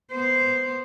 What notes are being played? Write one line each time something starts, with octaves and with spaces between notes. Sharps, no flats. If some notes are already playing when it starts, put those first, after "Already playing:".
B3 C5